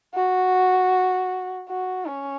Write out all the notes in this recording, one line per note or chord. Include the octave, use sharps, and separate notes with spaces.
F#4
F#4
C#4